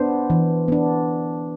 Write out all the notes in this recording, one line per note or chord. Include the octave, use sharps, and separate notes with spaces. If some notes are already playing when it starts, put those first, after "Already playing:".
Already playing: B3 D4 C5
E3
B3 D4